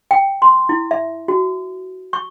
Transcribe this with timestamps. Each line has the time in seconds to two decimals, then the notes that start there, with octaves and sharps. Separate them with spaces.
0.11 G5
0.42 C6
0.69 E4
0.91 E5
1.28 F#4
2.13 C#6